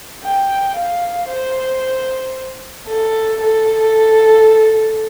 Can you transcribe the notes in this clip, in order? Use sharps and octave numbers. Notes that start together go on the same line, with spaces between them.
G5
F5
C5
A4
A4